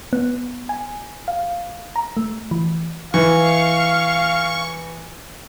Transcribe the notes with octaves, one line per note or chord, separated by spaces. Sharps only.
B3
G#5
F5
A#5
A3
E3
E3 F5 C#6